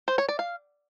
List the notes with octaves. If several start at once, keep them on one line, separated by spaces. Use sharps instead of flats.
C5
C#5
D5
F5